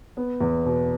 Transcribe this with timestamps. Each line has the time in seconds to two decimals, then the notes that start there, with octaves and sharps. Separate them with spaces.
0.17 B3
0.41 E2
0.65 B2